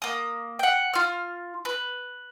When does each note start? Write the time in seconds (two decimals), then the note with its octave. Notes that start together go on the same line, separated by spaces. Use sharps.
0.02 A#3 D#6
0.59 F#5 G5
0.93 F4 F6
1.65 B4